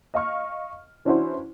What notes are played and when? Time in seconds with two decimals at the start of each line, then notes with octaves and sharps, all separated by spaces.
0.14 D#5 F5 C#6 F6
1.05 E3 C#4 D4 E4 F#4 C5